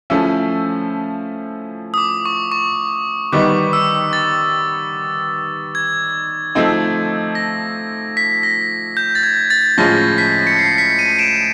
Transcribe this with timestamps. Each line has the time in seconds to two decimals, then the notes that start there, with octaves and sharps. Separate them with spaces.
0.10 F3 A3 C#4 E4
1.94 D#6
1.98 D6
2.25 C#6
2.52 C#6
3.32 D#3 G3 B3 D#4 D6
3.73 E6
4.13 A6
5.75 G#6
6.55 F3 A3 C4 D#4
7.35 A#6
8.17 B6
8.43 A#6
8.97 G6
9.15 A6
9.23 G#6
9.50 A6
9.78 A2 F3 G#3 C#4 F4 A#6
10.18 B6
10.47 C#7
10.59 C7
10.78 B6 C#7
10.98 C#7 D#7
11.19 D7 E7